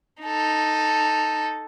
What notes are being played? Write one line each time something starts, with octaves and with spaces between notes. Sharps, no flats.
D#4 A4